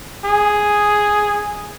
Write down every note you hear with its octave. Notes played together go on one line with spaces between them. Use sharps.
G#4